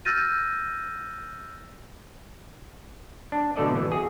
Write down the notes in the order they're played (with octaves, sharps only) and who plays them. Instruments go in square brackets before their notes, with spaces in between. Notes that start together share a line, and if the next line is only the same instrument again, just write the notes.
[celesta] E6 F6 G6 A6 A#6 D#7
[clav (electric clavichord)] D4
B2 D3 A3 A4 D5 D#5
B2 E3
F#4 G#4